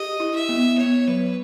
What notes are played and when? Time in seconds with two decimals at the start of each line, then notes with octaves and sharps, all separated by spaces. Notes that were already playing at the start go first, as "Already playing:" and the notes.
Already playing: G4 D#5
0.20 E4
0.35 E5
0.49 B3
0.78 B3 C#5
1.07 F#3 B4